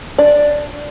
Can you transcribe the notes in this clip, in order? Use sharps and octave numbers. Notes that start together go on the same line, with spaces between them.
D4 D5